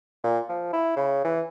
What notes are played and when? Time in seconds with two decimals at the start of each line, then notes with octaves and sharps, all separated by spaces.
0.24 A#2
0.49 F3
0.73 E4
0.96 C#3
1.24 E3